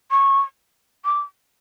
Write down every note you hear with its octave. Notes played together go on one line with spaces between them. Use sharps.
C#6
D6